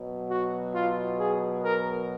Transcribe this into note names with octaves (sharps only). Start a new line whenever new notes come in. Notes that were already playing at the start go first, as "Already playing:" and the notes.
Already playing: B2 F#3
F#4
F4
G#4
A#4